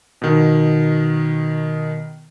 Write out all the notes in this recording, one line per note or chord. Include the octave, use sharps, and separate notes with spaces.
B2 D#3